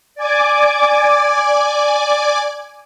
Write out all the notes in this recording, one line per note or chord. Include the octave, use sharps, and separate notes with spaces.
D5 G#5 D6